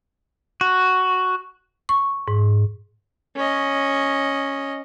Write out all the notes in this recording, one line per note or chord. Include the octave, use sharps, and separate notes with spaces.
F#4
C#6
G#2
C#4 D#5